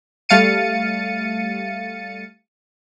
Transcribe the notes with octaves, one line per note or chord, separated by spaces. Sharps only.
G3 A3 F5 A6 C#7 D#7